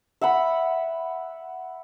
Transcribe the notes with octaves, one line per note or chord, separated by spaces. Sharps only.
E5 F#5 B5